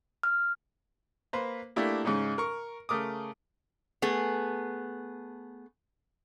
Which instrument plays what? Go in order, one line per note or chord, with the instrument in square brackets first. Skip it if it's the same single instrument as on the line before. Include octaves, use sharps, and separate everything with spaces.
[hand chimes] F6
[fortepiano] A#3 B4 C5
A3 A#3 D4 E4 G4
G#2 C#3 C#4 D#4
A#4 C#6
C#3 A3 A#4 D6 D#6
[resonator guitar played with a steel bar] A3 B3 G#4